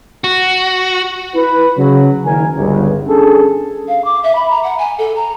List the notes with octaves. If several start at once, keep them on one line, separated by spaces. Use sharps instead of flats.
F#4
E4 B4
C#3 F#3
F#1 D#3 A#4 G#5
G1 C#2
C#4 D4 G#4 A4
F5
D6
E5
B5
A#5
F#5
G#5
A4
A#5